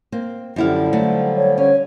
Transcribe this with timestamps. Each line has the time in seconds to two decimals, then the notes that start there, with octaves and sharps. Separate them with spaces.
0.12 A#3 C4
0.56 F#2 D3 F3 G3 E4 F5
0.93 F#3 A3
1.37 C#5
1.58 C#4 C#5